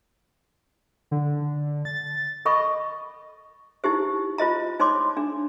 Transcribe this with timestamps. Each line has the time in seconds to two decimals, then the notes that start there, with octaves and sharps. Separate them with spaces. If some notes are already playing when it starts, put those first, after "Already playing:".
1.11 D3
1.85 A6
2.45 A4 D#5 B5 C#6
3.84 D#4 E4 G4 C5
4.38 F4 C5 D#5 A#5
4.80 D#4 C5 C#5 C6 D6
5.17 D4